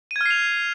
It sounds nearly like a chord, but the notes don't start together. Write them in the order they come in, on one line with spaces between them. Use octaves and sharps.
D#7 G#6 F6 C7 F7